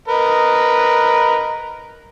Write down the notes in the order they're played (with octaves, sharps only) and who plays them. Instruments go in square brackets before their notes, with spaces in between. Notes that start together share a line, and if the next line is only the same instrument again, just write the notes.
[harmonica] A#4 B4 D#5